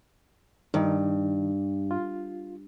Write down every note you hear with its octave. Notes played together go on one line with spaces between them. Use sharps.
G2 D#3 D#4
F4